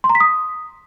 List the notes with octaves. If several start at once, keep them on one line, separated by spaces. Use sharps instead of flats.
C6
A#5
B6
D#6